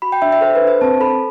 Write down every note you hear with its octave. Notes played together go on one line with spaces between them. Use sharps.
F#4 B5
G5
D4 E5
E5
A4 C5
B4
D4
C5
C4 A5
A4 B5